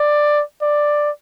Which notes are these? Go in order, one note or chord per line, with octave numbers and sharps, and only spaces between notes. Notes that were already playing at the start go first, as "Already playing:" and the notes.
Already playing: D5
D5